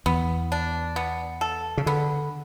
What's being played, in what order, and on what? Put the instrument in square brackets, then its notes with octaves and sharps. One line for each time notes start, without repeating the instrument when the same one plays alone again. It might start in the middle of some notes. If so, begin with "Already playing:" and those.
[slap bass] E2 [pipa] B3
[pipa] D4
B3
A4
[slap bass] C#3
[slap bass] D3 [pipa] B3